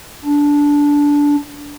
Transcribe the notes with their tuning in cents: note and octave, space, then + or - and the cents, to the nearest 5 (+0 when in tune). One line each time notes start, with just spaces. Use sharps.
D4 -15